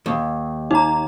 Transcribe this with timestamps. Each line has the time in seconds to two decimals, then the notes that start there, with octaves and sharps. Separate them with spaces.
0.06 D#2
0.71 D#4 A#5